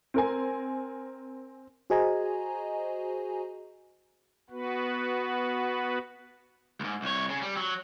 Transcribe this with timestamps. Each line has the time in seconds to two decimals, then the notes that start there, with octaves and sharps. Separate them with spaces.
0.14 C4 A#4 G#5
1.90 F#4 G#4 C5 D#5 G#5 A#5
4.50 B3 F#4 B4
6.80 C#2 G#2
7.02 C2 C#5
7.30 C#3
7.42 G3
7.57 F#3